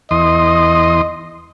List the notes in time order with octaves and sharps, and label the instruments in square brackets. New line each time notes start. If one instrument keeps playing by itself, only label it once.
[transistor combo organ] E2 C6 D#6 [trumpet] D#5